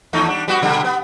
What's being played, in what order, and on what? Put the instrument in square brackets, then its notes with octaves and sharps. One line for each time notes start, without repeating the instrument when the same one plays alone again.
[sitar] D#2 A3 D#4
G3 D4
G3 B3 F#4
B2 D3 G3
B3